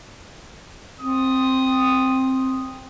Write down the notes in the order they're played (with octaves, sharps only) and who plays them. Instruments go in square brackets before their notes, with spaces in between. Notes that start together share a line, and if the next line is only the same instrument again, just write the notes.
[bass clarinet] C4 [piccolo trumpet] D#6